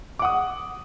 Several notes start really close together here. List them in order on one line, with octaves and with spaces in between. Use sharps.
D6 F#5 D#6